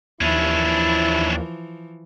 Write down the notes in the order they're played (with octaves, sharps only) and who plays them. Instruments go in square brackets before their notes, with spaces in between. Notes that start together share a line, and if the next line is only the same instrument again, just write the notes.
[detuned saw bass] D#2 [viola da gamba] E3 F3 [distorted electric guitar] C#4 D4 [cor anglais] E4